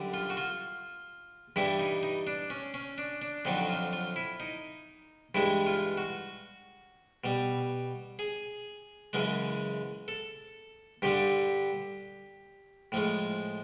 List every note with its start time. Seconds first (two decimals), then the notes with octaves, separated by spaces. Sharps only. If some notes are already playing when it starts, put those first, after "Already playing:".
Already playing: F#2 D3 G3
0.14 F4
0.30 F#4
0.37 F4
1.56 G2 E3 G3 E4
1.80 D#4
2.03 D#4
2.27 D4
2.50 C#4
2.74 C#4
2.98 D4
3.22 D4
3.45 F2 D3 F#3 D#4
3.58 F#4
3.69 F4
3.93 F4
4.16 E4
4.40 D#4
5.35 G2 E3 G#3 E4
5.66 F4
5.98 F#4
7.24 B2 G3
8.19 G#4
9.13 F#2 C#3 E3 G#3
10.08 A4
11.02 G2 D3 G3 G4
12.92 A2 F3 G#3